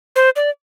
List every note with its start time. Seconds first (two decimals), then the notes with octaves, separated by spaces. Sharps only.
0.16 C5
0.36 D5